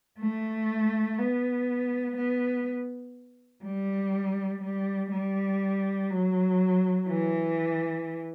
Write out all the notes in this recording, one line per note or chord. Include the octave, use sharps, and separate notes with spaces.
A3
B3
B3
G3
G3
G3
F#3
E3